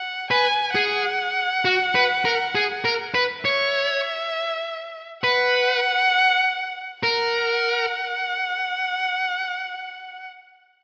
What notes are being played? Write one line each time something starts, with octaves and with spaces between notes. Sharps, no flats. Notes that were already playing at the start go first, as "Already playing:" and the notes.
Already playing: F#5
B4 G#5
G#4 F#5
F#4
B4
A#4
G#4
A#4
B4
C#5 E5
B4 F#5
A#4 F#5